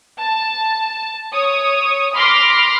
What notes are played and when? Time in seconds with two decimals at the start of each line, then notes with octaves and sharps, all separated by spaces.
0.18 A5
1.32 C#5 D#6
2.14 B5 C6 D6 F6 A#6